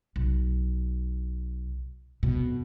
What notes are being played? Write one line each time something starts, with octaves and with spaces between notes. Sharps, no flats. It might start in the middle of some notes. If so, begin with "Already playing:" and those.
B1
F2 B2